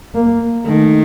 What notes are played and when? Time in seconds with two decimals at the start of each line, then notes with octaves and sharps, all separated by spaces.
0.15 A#3
0.67 D#3 A3